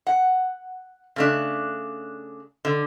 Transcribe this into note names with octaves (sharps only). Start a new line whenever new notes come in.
F#5
C#3 A3 D4
D3